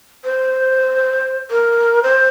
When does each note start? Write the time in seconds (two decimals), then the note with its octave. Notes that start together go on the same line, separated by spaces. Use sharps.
0.25 C5
1.51 A#4
2.03 C5